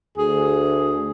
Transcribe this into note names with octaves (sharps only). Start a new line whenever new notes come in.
D2 G#4